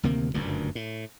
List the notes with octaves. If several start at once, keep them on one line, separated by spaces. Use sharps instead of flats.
D2 C3 D#3 A#3
F#1 D2 G2 A#2
A2